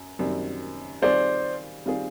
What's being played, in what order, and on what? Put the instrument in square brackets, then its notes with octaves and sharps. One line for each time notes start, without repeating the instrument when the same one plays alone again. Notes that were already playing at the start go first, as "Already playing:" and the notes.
Already playing: [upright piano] F#2
F#2 D#3 G3 C4
[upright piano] D#3 G3 C4 F4 G#4 [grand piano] C5 D5
[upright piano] D#3 G3 C4 F4 G#4